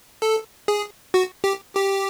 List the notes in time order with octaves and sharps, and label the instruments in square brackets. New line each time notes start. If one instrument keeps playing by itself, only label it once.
[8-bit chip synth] A4
G#4
F#4
G4
G4